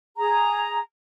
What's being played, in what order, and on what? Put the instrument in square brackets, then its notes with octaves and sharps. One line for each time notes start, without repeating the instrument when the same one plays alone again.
[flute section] G#4 A#5